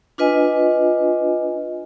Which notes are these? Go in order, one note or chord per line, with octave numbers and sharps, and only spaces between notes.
D4 F4 B4 D#5 G#5